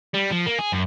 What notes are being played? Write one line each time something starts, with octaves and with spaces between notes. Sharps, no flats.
G3
F3
A#3
G#4
F#2